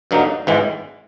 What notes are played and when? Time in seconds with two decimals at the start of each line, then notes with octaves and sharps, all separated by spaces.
0.11 G2 D3 F#3 A#3 D#4
0.47 G#1 G#2 E3 G#3